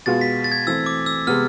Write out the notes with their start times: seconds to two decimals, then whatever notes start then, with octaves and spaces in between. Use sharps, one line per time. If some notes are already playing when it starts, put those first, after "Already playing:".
0.06 B2 G#3 B3 F4 A6
0.21 B6
0.44 A6
0.52 G#6
0.67 E3 A3 C4 E6
0.86 D6
1.06 E6
1.27 C3 G#3 B3 F6